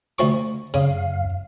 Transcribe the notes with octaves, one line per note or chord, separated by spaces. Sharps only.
D2 F3 C#6
F#2 C#3 F5